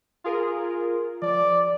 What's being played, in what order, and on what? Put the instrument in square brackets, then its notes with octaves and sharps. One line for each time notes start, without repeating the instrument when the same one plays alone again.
[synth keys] F4 G#4 A#4
[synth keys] F3 [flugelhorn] D5